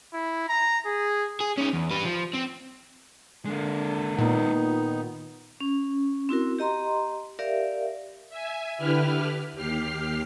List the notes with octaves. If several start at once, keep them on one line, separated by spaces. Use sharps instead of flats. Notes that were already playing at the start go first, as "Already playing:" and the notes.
E4
A#5
G#4
G#4
C#4 D#4
E2
G3 B4
F3
C4
D3 G#3 A#3
A#2 D#3 B3 D#4
C#4
C4 E4 F#4 A#4
G4 D#5 A#5 C6
G4 A#4 D5 E5 F5
E5 G#5
D3 E4 G4 B4 F6
D#2 G4 F6 C7